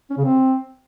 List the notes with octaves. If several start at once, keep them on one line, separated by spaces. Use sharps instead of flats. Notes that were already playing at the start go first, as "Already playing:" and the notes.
C#4
C#3
C4